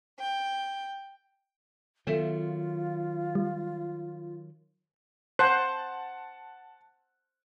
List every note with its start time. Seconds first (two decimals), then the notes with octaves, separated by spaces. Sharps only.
0.20 G5
2.07 D#3 F#3 B3 F4 A4 E5
3.35 G3
5.39 C5 F#5 A5 F#6